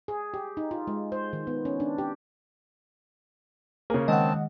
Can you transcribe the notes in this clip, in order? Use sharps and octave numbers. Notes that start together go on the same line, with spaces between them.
G#4
G4
D#4
F4
G#3
C5
D#3
B3
C#4
D4
G4
C#3 A#3 G#4
D#3 G#3 C4 D#5 F#5 A5